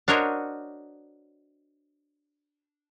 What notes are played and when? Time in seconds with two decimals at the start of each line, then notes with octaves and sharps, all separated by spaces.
0.08 D4 F#4 A#4 C5 C#5 D#5